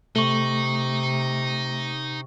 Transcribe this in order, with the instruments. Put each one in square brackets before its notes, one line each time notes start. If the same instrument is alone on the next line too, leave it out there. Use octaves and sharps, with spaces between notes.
[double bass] C3 [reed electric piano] A3 [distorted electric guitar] D#4 [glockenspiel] C#6 F#7 G7